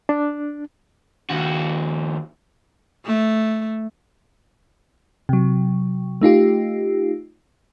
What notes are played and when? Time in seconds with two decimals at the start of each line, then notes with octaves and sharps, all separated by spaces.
0.09 D4
1.30 D#2 F#4
3.06 A3
5.29 C3 F#3
6.21 A3 D#4 F4 G4